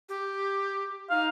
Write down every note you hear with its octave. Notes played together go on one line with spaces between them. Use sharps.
G4
D#4 F5